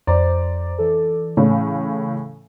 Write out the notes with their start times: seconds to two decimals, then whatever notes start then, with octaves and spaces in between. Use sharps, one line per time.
0.07 F2 C5 D5 A#5
0.78 E3 A4
1.37 A2 C#3 C#4